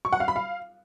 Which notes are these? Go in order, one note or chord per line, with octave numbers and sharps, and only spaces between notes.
C#6
F#5
F5
B5
F5